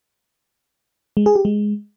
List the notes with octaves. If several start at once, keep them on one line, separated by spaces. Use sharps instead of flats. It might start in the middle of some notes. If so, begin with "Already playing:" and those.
G#3
G#4
G4
G#3